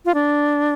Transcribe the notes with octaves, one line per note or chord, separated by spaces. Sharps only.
F4
D4